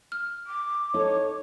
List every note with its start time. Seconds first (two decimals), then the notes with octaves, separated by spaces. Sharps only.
0.12 F6
0.46 D6
0.94 D#4 A4 C#5